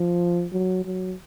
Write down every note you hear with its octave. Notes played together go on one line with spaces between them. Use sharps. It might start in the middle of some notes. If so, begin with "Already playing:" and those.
Already playing: F3
F#3
F#3